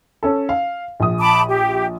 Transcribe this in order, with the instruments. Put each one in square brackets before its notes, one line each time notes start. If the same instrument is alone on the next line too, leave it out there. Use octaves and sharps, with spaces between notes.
[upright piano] C#4 A4
F5
A#1 D#6
[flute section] A5 B5 D6
G4